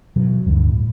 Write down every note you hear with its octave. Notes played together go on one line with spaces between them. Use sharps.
B2 E3 F#3
D2 G2
A2